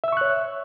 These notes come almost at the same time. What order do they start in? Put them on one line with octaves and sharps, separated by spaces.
E5 E6 C#6 F#6 C#5